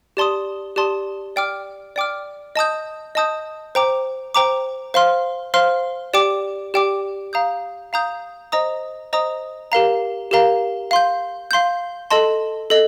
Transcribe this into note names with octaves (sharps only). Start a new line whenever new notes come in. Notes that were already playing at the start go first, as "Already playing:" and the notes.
G4 D5 A5 C6 D#6
G4 D5 A5 C6 D#6
D5 G5 D6 F6
D5 G5 D6 F6
D#5 A5 D#6 G6
D#5 A5 D#6 G6
C5 G5 A#5 D6
C5 G5 A#5 D6
C5 F5 C6 F6
C5 F5 C6 F6
G4 D5 G5 D6
G4 D5 G5 D6
F5 A#5 D#6 G6
F5 A#5 D#6 G6
C5 D#5 A#5 D#6
C5 D#5 A#5 D#6
G4 A#4 F5 A#5
G4 A#4 F5 A#5
F5 C6 G6
F5 C6 G6
A4 D#5 A5 C6
A4 D#5